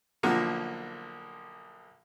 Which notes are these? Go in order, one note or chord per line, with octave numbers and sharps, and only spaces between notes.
B1 D3 F3 A#3 F#5 A#5